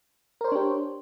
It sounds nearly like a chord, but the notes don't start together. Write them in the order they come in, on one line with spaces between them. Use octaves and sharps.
A#4 C5 C#5 D4 G4